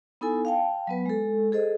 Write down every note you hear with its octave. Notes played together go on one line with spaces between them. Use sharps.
B3 D#4 E4 A4 G#5
F5 G5 A5
F#3 B3 B4
G#3 A4
G#4 A4 C5 D#5